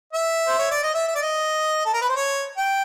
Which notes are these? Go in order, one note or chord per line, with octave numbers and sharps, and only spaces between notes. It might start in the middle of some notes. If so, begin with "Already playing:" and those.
E5
C5
C#5
D5
D#5
E5
E5
D5
D#5
A4
A#4
B4
C5
C#5
G5